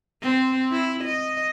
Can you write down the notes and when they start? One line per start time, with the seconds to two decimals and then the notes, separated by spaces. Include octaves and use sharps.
0.22 C4
0.72 E4
1.04 D#5